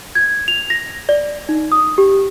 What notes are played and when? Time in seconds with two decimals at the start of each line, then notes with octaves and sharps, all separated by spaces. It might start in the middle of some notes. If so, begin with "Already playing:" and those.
0.15 G#6
0.48 F7
0.70 A#6
1.09 D5
1.49 D#4
1.72 D#6
1.98 G4